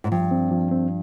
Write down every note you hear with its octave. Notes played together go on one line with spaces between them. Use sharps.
G#2
G2 F3
C4
F3
C4